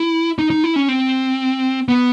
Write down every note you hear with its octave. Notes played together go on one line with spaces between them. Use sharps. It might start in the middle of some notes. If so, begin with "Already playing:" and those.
Already playing: E4
D#4
D#4
E4
C#4
C4
B3